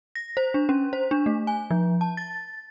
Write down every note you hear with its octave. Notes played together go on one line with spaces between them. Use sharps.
A#6
C5
D4
C#4
C5
D4
A3
G#5
F3
A5
A6